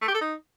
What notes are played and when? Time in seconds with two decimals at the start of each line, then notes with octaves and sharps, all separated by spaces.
0.01 A3
0.08 G4
0.14 A4
0.21 D#4